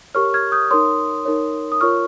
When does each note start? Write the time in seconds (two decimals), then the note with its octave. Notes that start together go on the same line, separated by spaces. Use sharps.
0.15 G4 A#4 C#5 C#6 F6
0.34 F6 G#6
0.52 D#6 G6
0.71 D#4 A#4 C#5 C6 D#6
1.25 D#4 A#4 C#5
1.72 D#6
1.81 F4 A#4 C#5 C#6 F6